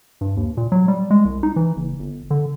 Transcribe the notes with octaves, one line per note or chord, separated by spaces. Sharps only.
G2
D#2
A#2
F#3
G3
G#3
C2
D#4
E3
F#1
G1
D3